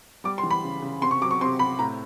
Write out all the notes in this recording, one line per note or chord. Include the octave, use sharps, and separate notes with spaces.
G3 D6
C6
E3
B5
C#3
C#3
C3 C6
C#6
F#3 D6
C#6
C3 C6
C3 B5
A2 A#5